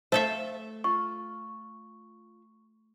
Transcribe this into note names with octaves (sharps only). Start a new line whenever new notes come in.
A3 A4 C5 E5 F5
F4 C#6